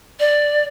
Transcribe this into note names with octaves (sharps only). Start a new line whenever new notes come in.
D5